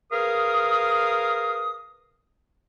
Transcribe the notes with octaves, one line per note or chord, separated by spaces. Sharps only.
G#4 A#4 B4 F5 D#6